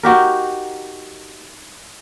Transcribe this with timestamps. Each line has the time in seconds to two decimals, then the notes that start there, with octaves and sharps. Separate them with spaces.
0.03 D#4 F#4 G4 A#4